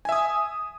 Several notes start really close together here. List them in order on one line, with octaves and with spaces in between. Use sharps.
G#5 E5 D#6